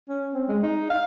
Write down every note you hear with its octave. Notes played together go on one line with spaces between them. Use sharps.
C#4
C4
G#3
D#4
F5